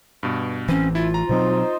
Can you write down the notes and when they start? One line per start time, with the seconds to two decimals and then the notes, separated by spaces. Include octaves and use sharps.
0.23 G2 B2
0.69 A1 E3 C4 C#4
0.95 E4 F4
1.14 A#5
1.29 B2 F#3 C4 D#4 C5